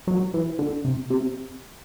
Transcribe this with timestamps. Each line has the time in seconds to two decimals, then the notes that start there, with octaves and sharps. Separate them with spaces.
0.07 F#3
0.34 E3
0.59 D3
0.84 C3
1.10 C3